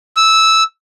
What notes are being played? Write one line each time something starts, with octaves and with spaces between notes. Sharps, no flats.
E6